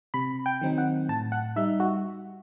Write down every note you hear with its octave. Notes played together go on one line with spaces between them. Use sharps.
C3 B5
G5
D#3 F#3 C4 D#4
F#5
A2 A5
F#5
G3 D#4 E5
F#4